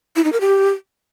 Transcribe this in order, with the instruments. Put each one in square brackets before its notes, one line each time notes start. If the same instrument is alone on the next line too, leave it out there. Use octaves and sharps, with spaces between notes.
[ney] E4
D#4
A#4
G4